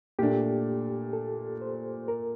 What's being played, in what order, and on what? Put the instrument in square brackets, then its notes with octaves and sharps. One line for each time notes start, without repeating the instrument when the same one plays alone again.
[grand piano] A#2 A3 D4 [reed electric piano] G4
[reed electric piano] A4
C5
A#4